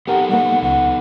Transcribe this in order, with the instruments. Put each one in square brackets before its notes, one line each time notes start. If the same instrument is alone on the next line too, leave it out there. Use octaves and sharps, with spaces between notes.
[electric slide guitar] B3 D#4 A4 [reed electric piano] G4 A#4 [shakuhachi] F#5
[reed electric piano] G3 A#3 [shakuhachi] F#5
[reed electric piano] C#2 [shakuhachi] F#5